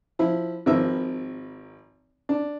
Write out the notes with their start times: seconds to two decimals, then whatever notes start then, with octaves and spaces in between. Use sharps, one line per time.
0.19 F3 E4
0.66 G#1 D#3 F3 A#4 B4 E5
2.29 D4